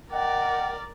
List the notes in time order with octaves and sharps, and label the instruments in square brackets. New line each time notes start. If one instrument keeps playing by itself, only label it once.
[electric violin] A#4 D5 [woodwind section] D#5 F#5 G5